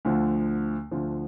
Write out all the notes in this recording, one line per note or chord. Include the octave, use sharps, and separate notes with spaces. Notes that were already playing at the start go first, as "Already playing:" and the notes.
D2 D3 F3
D2 D3 F3